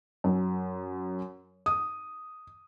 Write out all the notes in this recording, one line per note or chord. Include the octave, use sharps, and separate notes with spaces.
F#2
D#6